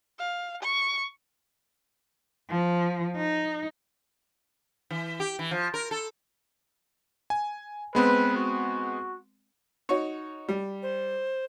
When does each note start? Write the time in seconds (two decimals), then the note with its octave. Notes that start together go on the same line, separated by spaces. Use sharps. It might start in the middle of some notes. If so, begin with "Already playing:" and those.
0.19 F5
0.63 C#6
2.49 F3
3.16 D#4
4.91 E3
5.20 G4
5.39 E3
5.51 F3
5.74 A#4
5.91 A4
7.30 G#5
7.95 G#3 B3 C4 B4
8.36 F#4
9.89 D#4 F#4 C#5
10.48 G3
10.83 C5